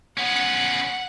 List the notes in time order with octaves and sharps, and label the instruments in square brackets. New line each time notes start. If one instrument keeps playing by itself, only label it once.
[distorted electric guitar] B3 C#4 [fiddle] F#5